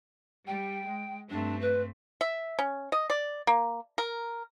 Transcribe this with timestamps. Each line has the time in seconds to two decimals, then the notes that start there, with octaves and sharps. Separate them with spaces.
0.47 G3 G5
0.86 G#3
1.30 G2 A3 C4 D4
1.61 B4
2.21 E5
2.59 C#4
2.92 D#5
3.10 D5
3.47 A#3
3.98 A#4